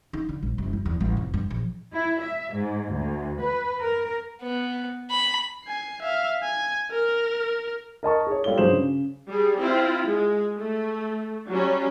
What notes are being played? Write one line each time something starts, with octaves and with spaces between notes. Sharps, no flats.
D#4
D3
A#1
F#1
E4
E2
A1
F1
G2
A#1
E4
E5
G#2
D2
B4
A#4
B3
B5
G#5 C7
E5 F5
G#5
A#4
A#4 D#5 A5 C#6
G#4 C#5
G3 F4 A4 C#5 G7
G2 F#3 G#4 C5 E7 F#7
C#3
G3 G#4
C4 E4 F4
G#3
A3
F#3 G3 C#4